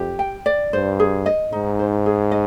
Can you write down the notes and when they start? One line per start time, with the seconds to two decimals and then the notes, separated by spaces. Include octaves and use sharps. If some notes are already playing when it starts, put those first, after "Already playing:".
Already playing: F2 G4
0.19 G5
0.46 D5
0.73 G2 C5
0.99 G#4
1.26 D#5
1.52 G#2 D#4
1.79 C5
2.06 G#4
2.31 D#5